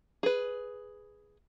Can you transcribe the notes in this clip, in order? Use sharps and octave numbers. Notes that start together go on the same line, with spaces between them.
G#4 B4